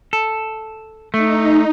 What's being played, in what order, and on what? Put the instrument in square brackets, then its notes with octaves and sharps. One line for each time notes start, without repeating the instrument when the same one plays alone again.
[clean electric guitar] A4
[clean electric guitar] A3 [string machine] D#4